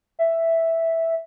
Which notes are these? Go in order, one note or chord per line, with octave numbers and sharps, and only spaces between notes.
E5